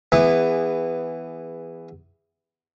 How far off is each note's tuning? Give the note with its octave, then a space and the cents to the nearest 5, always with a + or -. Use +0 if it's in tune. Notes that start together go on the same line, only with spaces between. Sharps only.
E3 +5 B3 +10 G#4 -20